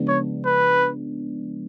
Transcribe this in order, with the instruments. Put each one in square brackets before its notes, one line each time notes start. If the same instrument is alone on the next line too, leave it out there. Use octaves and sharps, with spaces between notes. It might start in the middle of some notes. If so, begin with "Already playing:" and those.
Already playing: [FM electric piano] C#3 F3 G#3 B3 D4
[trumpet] C#5
B4